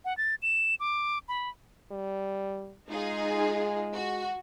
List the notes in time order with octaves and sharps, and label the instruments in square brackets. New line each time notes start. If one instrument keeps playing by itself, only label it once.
[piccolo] F#5
A6
E7
D6
B5
[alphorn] G3
[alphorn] G#3 [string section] D#4 F4 G#4
[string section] F#4